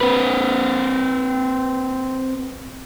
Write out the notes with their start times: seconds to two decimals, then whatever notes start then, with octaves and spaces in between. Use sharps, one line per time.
0.01 C4 B4